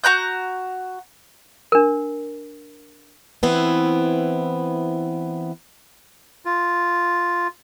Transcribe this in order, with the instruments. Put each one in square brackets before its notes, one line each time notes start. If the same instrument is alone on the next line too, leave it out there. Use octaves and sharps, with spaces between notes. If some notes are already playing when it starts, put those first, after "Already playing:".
[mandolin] F#4 A#5 F#6 G6
[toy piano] D4 A#4
[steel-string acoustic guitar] E3 B3 C4 E4
[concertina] F4